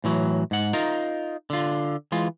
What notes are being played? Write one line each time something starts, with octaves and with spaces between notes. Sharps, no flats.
A2 E3 F#3
G#2 F#5
D#4 F4 A#4
D3 F4
E3 G#3 F4